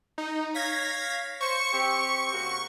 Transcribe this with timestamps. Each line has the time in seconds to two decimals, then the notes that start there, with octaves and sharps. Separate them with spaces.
0.18 D#4
0.54 C#5 F5 G#6 A#6 B6
1.41 C5 C#6 C#7
1.73 C4 G4
2.33 C#3 A#3 F#4